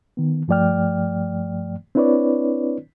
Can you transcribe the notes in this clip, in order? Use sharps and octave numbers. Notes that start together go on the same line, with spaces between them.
D#3 B3
G2 F3 A3 D5 G5 F6
C4 D4 E4 B4 C#5 D5